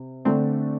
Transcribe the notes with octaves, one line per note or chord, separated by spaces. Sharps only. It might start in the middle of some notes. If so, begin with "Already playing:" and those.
Already playing: C3
D3 A3 C4 D4